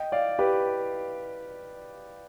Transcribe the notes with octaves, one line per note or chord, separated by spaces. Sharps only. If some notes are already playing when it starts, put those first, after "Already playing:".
Already playing: D#5 G5
D5 F5
G4 B4